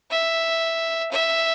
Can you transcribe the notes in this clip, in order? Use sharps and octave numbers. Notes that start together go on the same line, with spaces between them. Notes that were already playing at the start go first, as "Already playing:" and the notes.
E5
E5